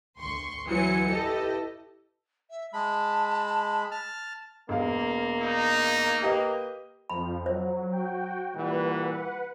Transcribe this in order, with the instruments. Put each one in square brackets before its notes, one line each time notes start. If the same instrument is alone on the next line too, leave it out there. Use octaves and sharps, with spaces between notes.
[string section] D2 C6 C#6
D2 E3 F#3 C5 G#5 C#7
E4 G4 A4 B4 D#5
[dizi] E5
[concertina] G#3 B5 [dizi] A5
[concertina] A5 F6
[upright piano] E1 F5 [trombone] A#3
[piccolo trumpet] D#4
[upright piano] G4 B4 D#5
[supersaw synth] F2 F3 [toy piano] B5
[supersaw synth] F#3 [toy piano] C5
[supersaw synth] F#4 G5
[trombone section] A#2 E3 G3 [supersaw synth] B4 F#5